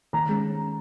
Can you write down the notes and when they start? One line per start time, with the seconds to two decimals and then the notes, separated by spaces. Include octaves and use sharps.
0.13 D#3 A#5
0.29 G#3 C#4